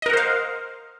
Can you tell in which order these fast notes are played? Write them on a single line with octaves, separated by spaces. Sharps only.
D#5 A#4 F#5 C5 F5